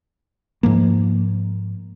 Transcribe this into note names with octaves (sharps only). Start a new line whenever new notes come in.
G#2 F3 A#3